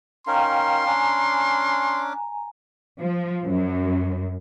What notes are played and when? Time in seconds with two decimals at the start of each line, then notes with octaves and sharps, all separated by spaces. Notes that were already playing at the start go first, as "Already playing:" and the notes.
0.27 C#4 D#4 A#4 F5 G5 A#5 C6
0.86 C#4 D4 G#5 A#5 D6
3.00 F3
3.45 F#2